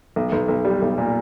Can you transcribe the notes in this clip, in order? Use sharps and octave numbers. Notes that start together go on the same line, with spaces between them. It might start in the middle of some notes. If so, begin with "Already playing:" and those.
B1
B1
B1
G3
B1
A#2